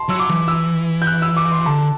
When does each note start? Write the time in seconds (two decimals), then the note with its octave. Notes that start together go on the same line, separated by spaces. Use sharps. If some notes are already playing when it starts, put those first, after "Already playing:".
Already playing: A5 C6
0.09 F#3 E6
0.20 D6
0.29 E3
0.48 E6
1.02 G6
1.07 F#6
1.22 E6
1.37 D6
1.52 C6
1.66 D3 A5